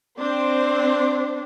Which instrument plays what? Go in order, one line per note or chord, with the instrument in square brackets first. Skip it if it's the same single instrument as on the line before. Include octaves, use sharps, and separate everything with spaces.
[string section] C4 C5 [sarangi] D4